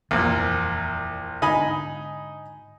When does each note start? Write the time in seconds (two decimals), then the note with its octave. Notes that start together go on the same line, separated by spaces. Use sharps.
0.11 D#1 C2 F2 A#2 E3
1.42 G#2 D3 D#4 G#5 B5